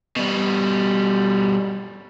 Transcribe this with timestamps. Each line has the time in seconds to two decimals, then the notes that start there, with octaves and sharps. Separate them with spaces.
0.16 B2 G3